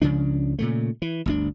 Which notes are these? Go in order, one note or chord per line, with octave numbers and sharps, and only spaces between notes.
C#2 C#3 F3 D4
A#2 C#3 A3
E3
G1 D2 D4